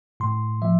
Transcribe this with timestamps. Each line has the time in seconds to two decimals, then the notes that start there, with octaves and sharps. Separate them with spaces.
0.20 A2 C6
0.62 F3 E5